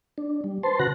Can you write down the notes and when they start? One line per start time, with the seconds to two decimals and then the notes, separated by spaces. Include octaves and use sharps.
0.18 D4
0.44 G3
0.63 B4 C5 A5 C6
0.79 C#3 F#4 B4 F#6 A#6